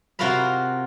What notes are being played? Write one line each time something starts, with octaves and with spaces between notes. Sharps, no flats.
C3 F4 F#4 A#4 F5 B5